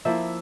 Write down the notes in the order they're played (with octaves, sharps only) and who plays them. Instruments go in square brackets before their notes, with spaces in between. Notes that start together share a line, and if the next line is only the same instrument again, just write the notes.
[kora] F3 A#3 E4 [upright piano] E5